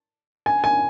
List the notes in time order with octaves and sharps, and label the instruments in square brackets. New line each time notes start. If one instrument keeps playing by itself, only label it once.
[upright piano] G#5
G#5